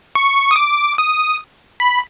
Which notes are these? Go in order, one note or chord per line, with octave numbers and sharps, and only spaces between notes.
C#6
D#6
D6
D#6
B5